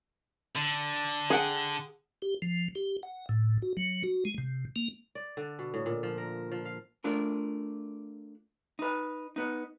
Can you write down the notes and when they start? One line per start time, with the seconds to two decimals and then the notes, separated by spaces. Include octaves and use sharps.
0.56 D3
1.30 G#4 F#5 G5
2.22 G4
2.42 F3
2.75 G4
3.03 F#5
3.29 A2
3.62 F#4
3.77 F#3
4.04 F#4
4.25 G#3
4.38 C3
4.76 A#3
5.15 D5
5.37 D3
5.59 B2
5.74 A2
5.86 A#2
6.03 F3
6.18 A#4
6.52 F3
6.65 F5
7.04 A3 D4 F4 A#4
8.79 D#4 B4
9.36 B3 D#4